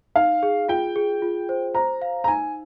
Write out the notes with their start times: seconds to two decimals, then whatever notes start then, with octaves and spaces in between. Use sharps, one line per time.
0.16 D#4 F5
0.43 G#4
0.69 F4 G5
0.96 G#4
1.22 F4
1.49 C5
1.75 C5 A#5
2.02 F5
2.24 A#5
2.28 D#4 G#5